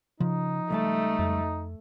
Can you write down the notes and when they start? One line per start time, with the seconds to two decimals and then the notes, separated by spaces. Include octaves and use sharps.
0.21 C#3 F3 D#4
0.70 C#2 G3 A3 A5
1.19 F2